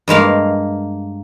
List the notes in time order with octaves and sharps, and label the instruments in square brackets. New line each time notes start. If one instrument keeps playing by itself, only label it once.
[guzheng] G2 G#3 A#3 F5